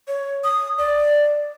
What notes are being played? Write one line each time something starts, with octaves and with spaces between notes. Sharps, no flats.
C#5
D#6
D5